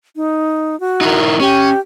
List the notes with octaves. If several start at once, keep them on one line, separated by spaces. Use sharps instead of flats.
D#4
F#4
D#4 E4 A#4
C#4 G4